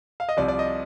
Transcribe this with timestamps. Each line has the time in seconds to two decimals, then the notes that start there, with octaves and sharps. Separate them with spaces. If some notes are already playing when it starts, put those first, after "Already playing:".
0.20 F5
0.29 D#5
0.37 C2 C3 F3 D5
0.48 D5
0.59 D#5